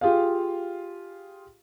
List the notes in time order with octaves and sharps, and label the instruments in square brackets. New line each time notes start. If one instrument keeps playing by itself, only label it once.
[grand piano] F4 G4 G#4 F5